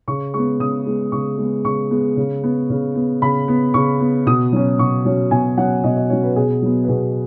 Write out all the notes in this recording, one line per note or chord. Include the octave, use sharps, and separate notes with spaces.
C#3 C#6
G#3 B3 C#6
C#3 D#6
G#3 B3
C#3 C#6
G#3 B3
C#3 C#6
G#3 B3
C#3
B3
C#3
B3
C#3 B5
B3
C#3 C#6
B3
B2 D#6
F#3 C#4
B2 C#6
F#3 C#4
B2 G#5
F#3 C#4 F#5
B2 D#5
D#5
F#3 C#4 C#5
B4
B2 G#4
F#3 B3
B4
B2 G#4